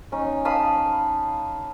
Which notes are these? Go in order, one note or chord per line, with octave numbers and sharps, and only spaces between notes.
C#4 D#4
F5 A5 B5 D#6